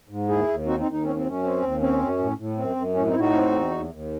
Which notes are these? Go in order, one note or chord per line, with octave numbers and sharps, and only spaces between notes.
G#2
D#2 E4 G#4
D#2
C4 D#4 F#4
C4 D#4
D#2
D#4
C4 C#4
C4
F#2 C#4
C4
D#2
C4 C#4
F#2
A2
A2
F#2 C4
F#2
A2 C#4
C4 D#4
A2 E4
D#4 F#4
C4
E2
D#2
D#2